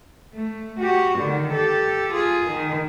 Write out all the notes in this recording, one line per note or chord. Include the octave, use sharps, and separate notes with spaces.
A3
F#4 G4
D3 D#3
G4 A4
F4 G#4
D#3